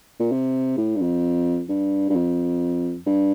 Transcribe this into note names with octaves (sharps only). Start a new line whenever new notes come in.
A#2
C3
A2
G2
F2
G2
G2
F2
G2